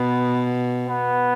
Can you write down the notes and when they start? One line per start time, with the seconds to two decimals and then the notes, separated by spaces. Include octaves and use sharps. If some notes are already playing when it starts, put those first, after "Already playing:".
Already playing: B2 B3
0.88 B3